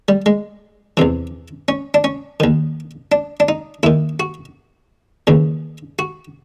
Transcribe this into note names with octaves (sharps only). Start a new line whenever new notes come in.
G3
G#3
E2 C3 E3
C#4
D4
C#4
D#2 D#3
D4
D4
D#4
D#2 D#3 E4
F#4
D#2 C#3 E3
F#4